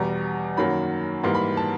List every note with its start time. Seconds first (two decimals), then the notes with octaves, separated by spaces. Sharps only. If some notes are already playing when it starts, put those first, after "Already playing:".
Already playing: E2 B2 G3 A#5
0.57 F#2 D#3 F#3 A#3 B5
1.24 G#2 E3 G3 A#3 C6
1.34 B5
1.57 A5